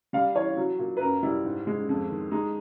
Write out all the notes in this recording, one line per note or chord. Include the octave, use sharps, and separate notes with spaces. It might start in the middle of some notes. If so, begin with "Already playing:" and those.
G3 F5
E3 C#5
F#3
A#2
B4
F#2 A#4
G3 E4
G#2
G#3
F2
D#3
G#3 D#4